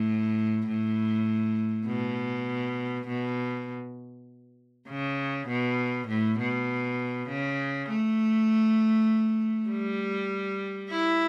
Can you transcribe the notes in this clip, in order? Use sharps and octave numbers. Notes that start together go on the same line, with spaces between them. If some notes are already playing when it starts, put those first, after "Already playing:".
Already playing: A2
A2
B2
B2
C#3
B2
A2
B2
C#3
A3
G3
E4